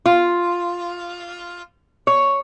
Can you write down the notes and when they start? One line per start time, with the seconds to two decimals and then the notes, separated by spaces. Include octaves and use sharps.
0.06 F4
2.07 C#5